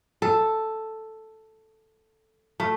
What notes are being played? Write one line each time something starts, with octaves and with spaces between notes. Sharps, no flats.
A4
A3